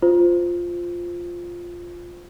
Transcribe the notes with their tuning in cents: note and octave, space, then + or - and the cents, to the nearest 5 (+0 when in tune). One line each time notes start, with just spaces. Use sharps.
F4 +0 C5 -15